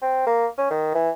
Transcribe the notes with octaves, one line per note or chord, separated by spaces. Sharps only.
C4
A#3
C#4
D#3
E3